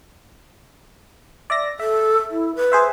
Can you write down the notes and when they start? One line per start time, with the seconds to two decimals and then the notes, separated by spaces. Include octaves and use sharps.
1.50 D5 E5 A#6
1.80 A4 E5
2.31 E4
2.56 B4
2.72 G#4 C5 E5